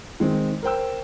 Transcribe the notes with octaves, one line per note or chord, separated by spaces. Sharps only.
D#3 G#3 C4
A#4 C5 G5 E6